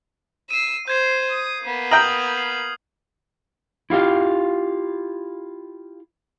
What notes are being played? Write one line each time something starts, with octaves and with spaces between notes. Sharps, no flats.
E6 C7 D#7
C5 G6 G#6 C7
D#6
A#3 B3
G5 A#5 D#6 F6 F#7
C7
E4 F4 G4 F5